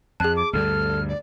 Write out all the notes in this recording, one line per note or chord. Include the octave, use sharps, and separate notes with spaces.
F2 G#4 A5 F#6
D6
D2 G2 G3 A4 F6
D5